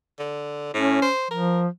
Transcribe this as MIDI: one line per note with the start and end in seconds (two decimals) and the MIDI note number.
0.19 0.70 50
0.74 1.02 45
0.74 1.08 61
1.02 1.28 72
1.31 1.67 53
1.31 1.61 70